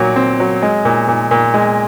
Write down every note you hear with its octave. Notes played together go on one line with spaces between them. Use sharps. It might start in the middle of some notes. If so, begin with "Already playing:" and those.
Already playing: A#2 F#3
C4
F#3
G#3
A#2
A#2
A#2
G#3